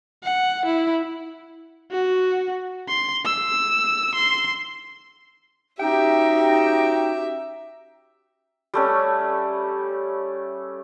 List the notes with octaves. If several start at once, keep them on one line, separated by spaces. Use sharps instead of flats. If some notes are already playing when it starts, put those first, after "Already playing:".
F#5
E4
F#4
C6
E6
C6
C#4 D#4 F#4 G4 E5 G5
G3 A3 C#4